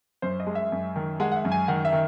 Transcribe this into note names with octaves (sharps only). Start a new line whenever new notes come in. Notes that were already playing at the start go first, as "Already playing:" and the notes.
F#2 C5
D#5
G#3
E5
F#2
D#3
G#3 F#5
F#5
E5
F#2
G#5
D#3 F#5
E5
D#3